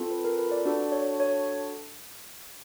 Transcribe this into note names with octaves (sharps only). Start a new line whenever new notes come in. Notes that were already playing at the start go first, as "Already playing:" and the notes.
Already playing: C4 F4 A4
B4
A#4
B4
D5
D4 F#4 A4 D5
C#5
C#5